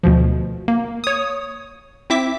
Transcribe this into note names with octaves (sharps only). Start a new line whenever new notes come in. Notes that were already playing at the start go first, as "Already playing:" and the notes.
D2 B2 F3
A#3
C#5 D#6
C4 E4 E5 D6 B6